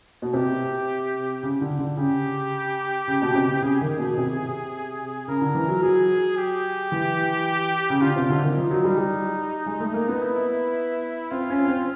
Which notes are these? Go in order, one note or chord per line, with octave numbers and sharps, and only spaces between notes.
B2
C3 G4
C#3
D3
D3
C#3 G4
C#3
B2
C#3
C3
C#3 G#4
D#3
B2
C3
C#3 A#4
D3
E3
F#3
F#3 G#4
G4
E3
C#3
D3 F4
C3
D3
D#3
F3 D#4
F#3
G3
G3
G#3
A3
A#3
B3
E4
C4 F4
C#4
C4